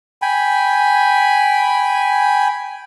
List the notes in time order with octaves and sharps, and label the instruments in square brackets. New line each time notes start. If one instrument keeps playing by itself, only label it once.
[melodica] G5 G#5 B5